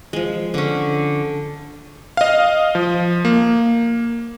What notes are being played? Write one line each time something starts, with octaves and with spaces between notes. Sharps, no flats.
F3 G#3
D3 C#4
D#5 F5
F3
A#3